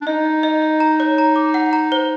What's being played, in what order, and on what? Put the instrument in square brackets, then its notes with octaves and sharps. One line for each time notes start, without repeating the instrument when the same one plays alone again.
[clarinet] D4
[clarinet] D#4 [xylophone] D#5
[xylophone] D#5
D#5
D#5
A#5
C#5
A#5
D6
F#5
A#5
C5